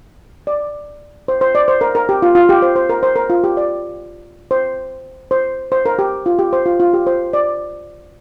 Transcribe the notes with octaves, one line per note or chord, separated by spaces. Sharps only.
D5
C5
C5
D5
C5
A#4
A#4
G4
F4
F4
G4
C5
C5
A#4
C5
A#4
F4
G4
D5
C5
C5
C5
A#4
G4
F4
G4
C5
F4
F4
G4
C5
D5